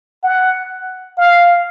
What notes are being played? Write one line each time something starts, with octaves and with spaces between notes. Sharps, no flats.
F#5
F5